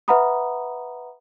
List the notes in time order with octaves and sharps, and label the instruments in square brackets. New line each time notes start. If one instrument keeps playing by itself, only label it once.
[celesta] B4 E5 F#5 A#5 B5 D#6